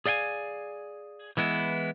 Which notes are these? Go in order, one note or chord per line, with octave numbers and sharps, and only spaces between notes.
G#4 D5 F5 G5 G#5
E3 G#3 B3 E4